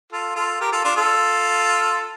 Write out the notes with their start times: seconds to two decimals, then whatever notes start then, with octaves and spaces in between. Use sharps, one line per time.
0.12 F4 A4
0.36 F4 A4
0.60 G4 A#4
0.72 F4 A4
0.84 D4 F4
0.96 F4 A4